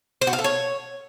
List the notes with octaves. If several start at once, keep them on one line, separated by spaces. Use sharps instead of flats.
C5
F#4
F5
A4
C#5